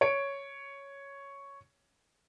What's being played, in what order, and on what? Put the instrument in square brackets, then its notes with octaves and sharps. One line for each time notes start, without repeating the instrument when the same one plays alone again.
[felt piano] C#5 D7